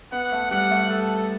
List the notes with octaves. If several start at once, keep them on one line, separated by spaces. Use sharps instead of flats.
B3 F#5
A3
G3 F#5
A3
A4